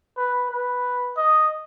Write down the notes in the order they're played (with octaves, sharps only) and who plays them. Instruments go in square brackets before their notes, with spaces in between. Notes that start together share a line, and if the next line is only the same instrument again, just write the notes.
[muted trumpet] B4
B4
D#5